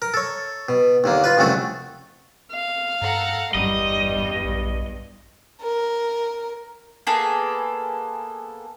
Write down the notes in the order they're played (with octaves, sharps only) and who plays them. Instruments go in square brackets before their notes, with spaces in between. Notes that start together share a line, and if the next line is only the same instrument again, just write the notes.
[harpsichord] A#4
A4 C#5
B2
D#2 D3 A#3
F4 B4
C2 F2 C#3 A3 F#4 A4
[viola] F5
[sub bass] G2 [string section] A4 F#5 A#5
[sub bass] G1 [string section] E2 G2 [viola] G3 [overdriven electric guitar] D#5
[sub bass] A#1
[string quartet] A#4
[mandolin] A#3 B3 G#4 A4